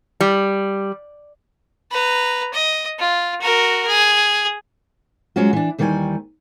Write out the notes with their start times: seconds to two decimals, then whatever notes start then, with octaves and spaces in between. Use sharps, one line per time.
0.20 G3
1.92 B4 A#5
2.54 D#5
2.99 F4
3.41 F#4 A#4
3.87 G#4
5.36 F#3 G#3 C#4 F4 F#4
5.53 E3 D4
5.78 D#2 D#3 E3 G3 A#4 G#5